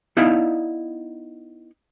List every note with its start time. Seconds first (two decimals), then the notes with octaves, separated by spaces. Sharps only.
0.17 B3 D#4 E4 D5 F5